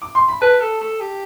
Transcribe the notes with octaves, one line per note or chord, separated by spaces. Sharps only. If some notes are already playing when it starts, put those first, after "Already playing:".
D6
C6
B5
B4 A5
A4
A4
G4